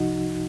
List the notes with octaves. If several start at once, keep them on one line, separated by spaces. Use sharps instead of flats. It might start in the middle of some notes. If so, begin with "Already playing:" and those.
Already playing: C2 C3 F3 D#4 F#4